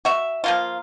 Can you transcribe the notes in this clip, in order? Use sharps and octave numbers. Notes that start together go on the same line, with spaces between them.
F#4 E5
F3 A#3 F4